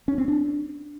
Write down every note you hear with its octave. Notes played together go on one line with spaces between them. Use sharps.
C#4
C4
D4